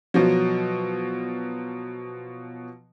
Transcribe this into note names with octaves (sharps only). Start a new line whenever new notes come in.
B2 F3 F#3